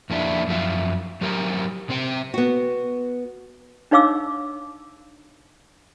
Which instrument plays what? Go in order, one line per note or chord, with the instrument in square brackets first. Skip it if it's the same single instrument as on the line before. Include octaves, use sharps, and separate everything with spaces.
[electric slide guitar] F2 A#3 D4 E4
F#2 F3 F#3 E5 F5
F#3 G4 A#4 C5 A#5
C3 C4 C5 G5
[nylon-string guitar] B3 F#4
[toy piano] D4 D#4 C#5 F5 D6 E6